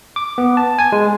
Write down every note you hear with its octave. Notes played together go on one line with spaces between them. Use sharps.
D6
B3
A5
G#5
G#3